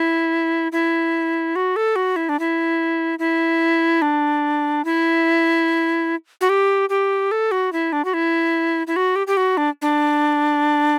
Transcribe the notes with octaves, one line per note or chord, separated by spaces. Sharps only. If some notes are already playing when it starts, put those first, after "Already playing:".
Already playing: E4
E4
F#4
A4
F#4
E4
D4
E4
E4
D4
E4
F#4
G4
G4
A4
F#4
E4
D4
F#4
E4
E4
F#4
G4
G4
F#4
D4
D4